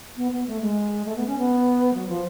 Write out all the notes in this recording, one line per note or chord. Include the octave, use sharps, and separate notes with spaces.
B3
B3
A3
G#3
A3
B3
C#4
B3
F#3
F3